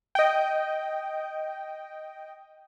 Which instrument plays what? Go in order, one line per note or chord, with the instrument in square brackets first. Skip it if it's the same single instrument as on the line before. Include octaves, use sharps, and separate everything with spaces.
[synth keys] D#5 G5